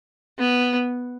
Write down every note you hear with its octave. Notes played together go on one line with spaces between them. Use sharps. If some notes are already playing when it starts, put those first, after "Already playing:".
B3